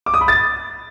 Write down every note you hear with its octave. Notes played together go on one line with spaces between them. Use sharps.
D6
D#6
B5
A6